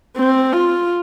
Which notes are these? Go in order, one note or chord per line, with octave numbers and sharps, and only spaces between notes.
C4
F4